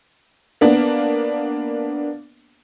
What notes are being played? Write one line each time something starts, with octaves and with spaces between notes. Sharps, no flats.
A#3 B3 D4